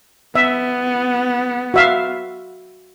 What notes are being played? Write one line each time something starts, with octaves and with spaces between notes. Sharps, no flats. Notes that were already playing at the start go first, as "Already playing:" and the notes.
B3 E5
F#4 E5 F5